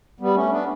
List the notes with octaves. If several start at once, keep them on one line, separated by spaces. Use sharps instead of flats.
G3 B3
A3 C#4
B3 D4